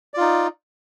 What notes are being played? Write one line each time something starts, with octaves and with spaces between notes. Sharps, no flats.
D#4 F4 D5